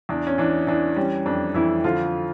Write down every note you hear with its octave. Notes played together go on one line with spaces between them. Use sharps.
E2 D4
C#4
E3 D4
E3 D4
G3 C#4
F2 D4
F2 E3 E4
D3 F3 F4